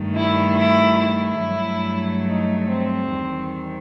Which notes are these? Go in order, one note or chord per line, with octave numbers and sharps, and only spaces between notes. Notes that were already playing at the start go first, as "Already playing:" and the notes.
Already playing: G2 D#3 A3
E4
E4
E4
G2 F#3 A3
D#4
C4
E2 D#3 G3